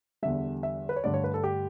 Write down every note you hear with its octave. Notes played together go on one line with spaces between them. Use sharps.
E2 D3 G3 E5
E5
B4
C#5
G2 D3 A3 D5
C#5
B4
A4
G4